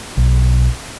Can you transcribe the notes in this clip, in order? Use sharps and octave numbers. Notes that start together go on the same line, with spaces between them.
B1